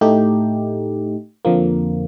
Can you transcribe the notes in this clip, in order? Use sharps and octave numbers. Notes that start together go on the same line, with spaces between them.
A2 A3 D#4 G4
F2 D3 F3 A#3